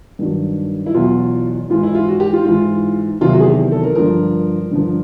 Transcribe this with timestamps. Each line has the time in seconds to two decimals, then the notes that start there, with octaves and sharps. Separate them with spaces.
0.19 G2 D#3 F#3
0.86 E4
0.94 E2 B2 F#3 F4
1.70 G#2 E3 F4
1.83 E4
1.95 F4
2.08 F#4
2.20 G4
2.33 F4
2.45 G#2 E3 F4
3.21 E2 C3 D#3 F#3 F4
3.33 F#4
3.40 G#4
3.46 G4
3.71 A4
3.83 A#4
3.95 G2 D3 F3 A#4
4.71 G2 D3 F3